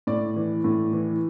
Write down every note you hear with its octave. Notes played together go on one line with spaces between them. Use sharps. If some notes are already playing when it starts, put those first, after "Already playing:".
A2 D5
E3
A2
E3